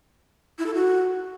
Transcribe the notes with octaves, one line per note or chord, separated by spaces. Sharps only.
E4
A4
F#4